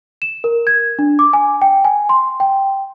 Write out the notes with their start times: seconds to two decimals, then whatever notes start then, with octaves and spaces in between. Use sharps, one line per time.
0.22 E7
0.44 A#4
0.67 G#6
0.99 D4
1.19 D6
1.33 G#5
1.62 G5
1.85 G#5
2.09 C6
2.40 G5